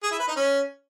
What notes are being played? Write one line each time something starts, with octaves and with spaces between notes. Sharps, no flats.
G#4
E4
B4
D#4
C#4